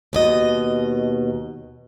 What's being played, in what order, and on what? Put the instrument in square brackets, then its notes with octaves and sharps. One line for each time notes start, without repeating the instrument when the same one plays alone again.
[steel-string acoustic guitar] D#2 B2 D#5